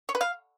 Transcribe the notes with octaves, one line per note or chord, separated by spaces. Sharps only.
C#5
B4
F5